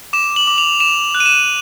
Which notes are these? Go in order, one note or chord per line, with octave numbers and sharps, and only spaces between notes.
D6 E7
F#7
D6
F7
D6 E7
F#6
D#7
E7